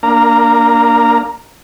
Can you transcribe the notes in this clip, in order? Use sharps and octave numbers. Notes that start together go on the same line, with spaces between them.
A#3 D4 F5 A#5